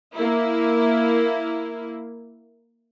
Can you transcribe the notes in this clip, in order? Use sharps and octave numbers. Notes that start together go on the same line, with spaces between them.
A#3 E4